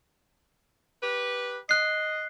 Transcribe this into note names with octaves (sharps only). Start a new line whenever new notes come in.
G4 B4
D#5 F#6 C7